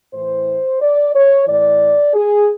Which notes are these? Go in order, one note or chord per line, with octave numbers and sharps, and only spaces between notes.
A2 E3 C5
D5
C#5
A2 E3 D5
G#4